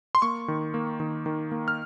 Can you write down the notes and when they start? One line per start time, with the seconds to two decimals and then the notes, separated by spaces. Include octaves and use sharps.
0.15 C6
0.22 A#3 C#6
0.48 D#3
0.74 A#3
1.00 D#3
1.26 D#3
1.52 A#3
1.68 F6